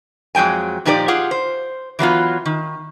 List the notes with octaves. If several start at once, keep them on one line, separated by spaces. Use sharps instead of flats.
F2 F#3 G#3 G5 G#5
A#2 F3 D#4 G4 C5 D5
F4 G4 G#4 F#5
C5
E3 F#3 B3 F4
D#3